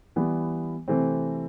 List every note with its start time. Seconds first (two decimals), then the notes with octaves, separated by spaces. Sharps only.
0.16 E3 G3 B3
0.88 C3 E3 A3 C4